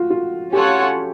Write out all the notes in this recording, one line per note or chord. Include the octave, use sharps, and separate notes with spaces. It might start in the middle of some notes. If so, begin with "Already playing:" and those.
Already playing: F4 F#4
F4
C#4 F4 G4 A4 C#5 F#5